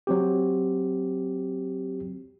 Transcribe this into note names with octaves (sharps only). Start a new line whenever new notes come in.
F#3 C4 G4